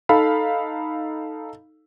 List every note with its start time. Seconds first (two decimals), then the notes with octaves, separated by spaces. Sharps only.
0.09 D#4 A4 F5 B5